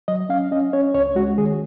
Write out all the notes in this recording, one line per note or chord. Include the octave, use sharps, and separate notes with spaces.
F#3 D#5
C#4 F5
C#4 D#5
C#4 C#5
C#2 C#5
G#3 F#4
D#3 G#4